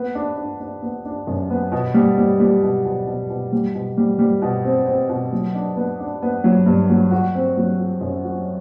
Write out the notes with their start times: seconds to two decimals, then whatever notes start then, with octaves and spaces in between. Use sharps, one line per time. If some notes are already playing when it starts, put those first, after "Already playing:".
Already playing: B3
0.15 D4
0.37 D4
0.60 D4
0.82 B3
1.05 D4
1.27 F#2
1.50 B3
1.72 B2
1.94 G3
2.18 G3
2.40 G3
2.63 B2
2.85 B2
3.07 B2
3.30 B2
3.52 G3
3.74 B2
3.98 G3
4.19 G3
4.42 B2
4.64 C4
4.86 C4
5.09 B2
5.32 F#3
5.55 D4
5.77 B3
6.00 D4
6.22 B3
6.44 F#3
6.66 G2
6.90 F#3
7.11 F#4
7.35 C4
7.57 F#3
7.80 F#4
8.01 F#2
8.24 F#4